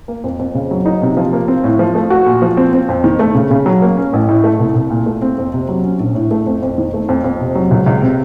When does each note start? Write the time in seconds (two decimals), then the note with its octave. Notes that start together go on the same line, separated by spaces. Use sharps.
0.08 A#3
0.24 F2
0.39 F2
0.54 C#3
0.71 F#3
0.86 D#4
1.02 C3
1.17 F3
1.33 A#3
1.48 C4
1.64 A2
1.79 F3
1.95 A3
2.10 F#4
2.26 A#2
2.42 F3
2.57 C4
2.73 C4
2.89 F2
3.04 D#3
3.19 A3
3.35 C#3
3.50 C#3
3.66 F#3
3.82 A#3
3.97 C#4
4.13 A1
4.29 A2
4.44 A3
4.59 C2
4.75 C2
4.91 A#2
5.06 A3
5.22 C4
5.38 F2
5.53 C3
5.69 F#3
5.84 C#4
6.00 A#1
6.15 A2
6.31 A3
6.46 F2
6.62 F2
6.78 D#3
6.94 A3
7.09 F2
7.24 F2
7.40 C3
7.55 F#3
7.71 C#2
7.86 C#2
8.02 C3